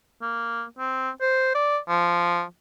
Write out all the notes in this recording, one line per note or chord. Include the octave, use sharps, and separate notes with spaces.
A#3
C4
C5
D5
F3